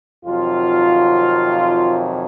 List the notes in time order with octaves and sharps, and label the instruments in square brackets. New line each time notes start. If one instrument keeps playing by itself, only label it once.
[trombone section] F2 C3 D#3 F#3 F4